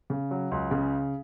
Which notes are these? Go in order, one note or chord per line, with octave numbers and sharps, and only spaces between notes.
C#3
F#3
C#2
C#3